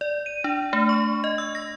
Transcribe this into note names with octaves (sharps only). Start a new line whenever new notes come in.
D5
D#7
D4
A3
C#6
D#5
E6
A#6